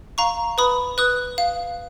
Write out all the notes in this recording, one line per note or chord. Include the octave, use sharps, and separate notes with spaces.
F5 A#5 C#6
B4 B5 D#6
B4 D#6 F#6
F5